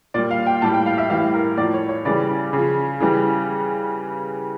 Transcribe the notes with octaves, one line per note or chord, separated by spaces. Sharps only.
A#2 G3 D5
F5
G5
A2 G3 A5
G5
F5
E5
A2 E3 G3 F5
A#4
A2 F3 D5
C#5
C#5
C#3 E3 G3 D5
C#3 F3
C#3 E3 G3